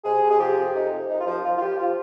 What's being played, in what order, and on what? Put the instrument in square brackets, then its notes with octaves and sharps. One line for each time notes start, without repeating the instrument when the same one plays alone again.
[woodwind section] C3 G#4
C3
G#4
F3 G4
F2
C3 D#4
C3
C2 D#4
F4
F3
F3 F4
F4
F3 G4
F3 F4